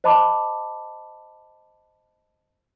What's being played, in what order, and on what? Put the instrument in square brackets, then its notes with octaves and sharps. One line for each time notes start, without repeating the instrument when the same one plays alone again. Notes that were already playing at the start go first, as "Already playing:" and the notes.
[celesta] C5 D#5 A5 B5 D6